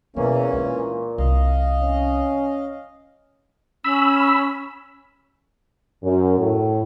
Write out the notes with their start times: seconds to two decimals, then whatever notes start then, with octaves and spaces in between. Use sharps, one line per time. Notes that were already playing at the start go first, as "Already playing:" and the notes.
0.16 E2 B2 E3 A#3 B3 C#4
0.53 A#2 G#3 D4
1.18 C2 D#5 F5
1.82 C#4
3.84 C#4 B5 E6
6.04 F#2
6.39 A2